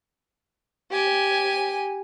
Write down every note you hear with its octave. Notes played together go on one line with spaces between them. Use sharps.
G4 G#5